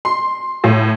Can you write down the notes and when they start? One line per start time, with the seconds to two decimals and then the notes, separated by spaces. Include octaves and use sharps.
0.05 C6
0.64 A2